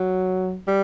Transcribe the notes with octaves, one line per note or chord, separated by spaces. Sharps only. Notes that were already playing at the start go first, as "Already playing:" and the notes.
Already playing: F#3
G3